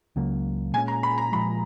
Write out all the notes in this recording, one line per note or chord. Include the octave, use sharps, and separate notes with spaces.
C#2 C#3 F#3 A#3
A#2 G#3 C#4 G#5
A#5
B5
A#5
A#2 F3 G#3 B5